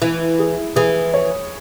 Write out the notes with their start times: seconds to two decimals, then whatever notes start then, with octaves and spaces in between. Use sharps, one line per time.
0.02 E3 E4
0.39 G#4
0.76 E3 G#4
1.14 C#5